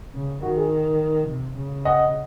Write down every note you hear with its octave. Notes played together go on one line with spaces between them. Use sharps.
C#3
D#3 F#4
G#4
C3
C#3
D#5 F#5